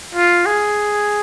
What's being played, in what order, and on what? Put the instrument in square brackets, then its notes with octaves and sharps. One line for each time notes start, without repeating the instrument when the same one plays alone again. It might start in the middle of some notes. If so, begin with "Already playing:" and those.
[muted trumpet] F4
G#4